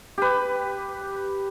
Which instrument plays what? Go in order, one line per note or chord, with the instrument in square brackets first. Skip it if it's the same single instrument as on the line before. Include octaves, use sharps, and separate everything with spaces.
[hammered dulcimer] G4 B4